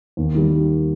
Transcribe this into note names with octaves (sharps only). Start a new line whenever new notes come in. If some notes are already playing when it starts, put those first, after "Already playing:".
D#2
D#3 G3